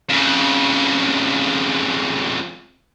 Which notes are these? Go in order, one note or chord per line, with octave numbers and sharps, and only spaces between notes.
F2 C#3